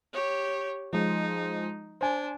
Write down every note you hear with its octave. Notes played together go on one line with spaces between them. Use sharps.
G4 C#5
F3 G#3 D#4
D4 C5 G#5